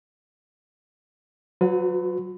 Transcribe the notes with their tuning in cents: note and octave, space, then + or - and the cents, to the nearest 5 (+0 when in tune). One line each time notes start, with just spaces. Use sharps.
F#3 +0 F#4 -45 B4 +30